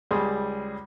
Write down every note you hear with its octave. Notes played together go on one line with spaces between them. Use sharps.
C#2 G3 G#4 C6